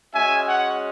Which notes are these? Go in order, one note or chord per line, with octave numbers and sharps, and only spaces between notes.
G#3 C#4 F#4 E5 G#5
C#5 F#5